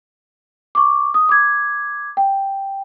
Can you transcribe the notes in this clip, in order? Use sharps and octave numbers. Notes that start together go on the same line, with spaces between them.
C#6 D6
D#6
D6 G#6
G5